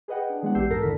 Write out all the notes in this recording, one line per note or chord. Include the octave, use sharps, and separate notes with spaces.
G#4 B4 D#5 F#5 G5
D4 G#4
E3 G#3 B3 D4 F#5
A#1 E3 G4 E6 G6 C7
F2 G#2 A4 A#4 A#6
A#2 D3 E3 E4 A4 B6